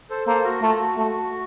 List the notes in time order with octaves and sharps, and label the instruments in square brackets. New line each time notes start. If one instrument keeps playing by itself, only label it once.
[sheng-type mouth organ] A4 C5
[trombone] A#3 [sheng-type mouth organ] A4 C5
[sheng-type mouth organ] F#4 A#4
[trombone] A3 [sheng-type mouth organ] F4 A4
[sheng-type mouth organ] F#4
[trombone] A3